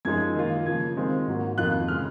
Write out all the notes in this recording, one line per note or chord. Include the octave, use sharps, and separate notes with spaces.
F#2 F3 G#3 D#4 G#6
D#3 A#3 F4
C#3 F3 A#3 G#6
D#3 G#3 C4 F4
G#2 F#3 A#3
F2 D#3 A#3 F4 F#6
C#3 G#3 F6